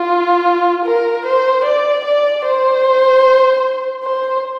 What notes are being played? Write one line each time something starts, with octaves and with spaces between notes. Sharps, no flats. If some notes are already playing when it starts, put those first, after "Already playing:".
Already playing: F4
A#4
C5
D5
D5
C5
C5